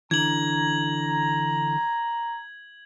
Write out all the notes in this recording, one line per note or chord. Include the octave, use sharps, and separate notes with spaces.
D3 E3 A#5 G#6 F#7